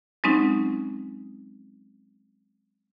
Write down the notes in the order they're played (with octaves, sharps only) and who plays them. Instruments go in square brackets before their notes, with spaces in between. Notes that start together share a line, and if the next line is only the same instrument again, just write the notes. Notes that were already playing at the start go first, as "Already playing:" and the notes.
[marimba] F#3 G#3 C4 C#4 D#4